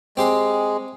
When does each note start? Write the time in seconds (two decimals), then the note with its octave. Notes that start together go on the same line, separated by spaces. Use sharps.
0.17 G#3 C4 G4 C6